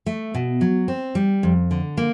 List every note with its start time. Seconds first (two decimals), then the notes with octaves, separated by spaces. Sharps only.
0.06 A3
0.35 B2
0.61 F#3
0.88 C4
1.15 G3
1.43 F2
1.71 D3
1.97 A#3